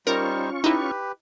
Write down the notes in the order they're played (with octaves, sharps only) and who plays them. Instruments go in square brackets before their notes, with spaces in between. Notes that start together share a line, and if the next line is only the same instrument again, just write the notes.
[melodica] G3 D#4 C5 [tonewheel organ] C#4 F4 C#6 [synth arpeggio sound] A#4
[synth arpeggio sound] D#4 E4 [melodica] G4 B4